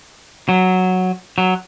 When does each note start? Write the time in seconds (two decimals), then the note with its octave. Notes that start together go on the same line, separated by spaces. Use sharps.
0.49 F#3
1.38 F#3